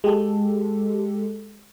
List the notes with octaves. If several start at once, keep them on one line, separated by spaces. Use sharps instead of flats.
G#3 G4 A4